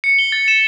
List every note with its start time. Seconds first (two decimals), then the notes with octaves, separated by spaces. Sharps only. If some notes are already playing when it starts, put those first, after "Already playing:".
0.04 C#7
0.19 G7
0.32 A6
0.48 E7